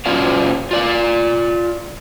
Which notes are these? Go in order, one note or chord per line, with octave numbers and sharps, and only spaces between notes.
A#2 F#3 C#4 F4 D5 F5
F4 D5 F5